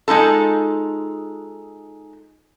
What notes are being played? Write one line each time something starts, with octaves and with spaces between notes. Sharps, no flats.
G#3 D#4 F4 A4